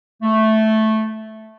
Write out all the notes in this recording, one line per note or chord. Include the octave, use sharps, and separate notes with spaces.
A3